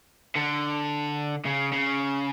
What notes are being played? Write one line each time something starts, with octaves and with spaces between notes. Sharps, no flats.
D3
C#3
C#3